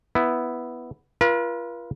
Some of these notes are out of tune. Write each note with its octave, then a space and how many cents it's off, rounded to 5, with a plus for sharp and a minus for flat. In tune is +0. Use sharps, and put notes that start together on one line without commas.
B3 +0 E4 +0
F4 -25 B4 -45